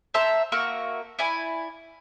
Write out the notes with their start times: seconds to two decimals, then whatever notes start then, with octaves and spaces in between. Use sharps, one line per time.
0.14 C5 E5 A5 A#5
0.52 A#3 F#4 E5 C#6
1.19 E4 D5 G#5